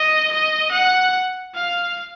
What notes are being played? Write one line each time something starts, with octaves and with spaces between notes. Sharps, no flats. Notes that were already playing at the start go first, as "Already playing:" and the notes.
Already playing: D#5
D#5
F#5
F5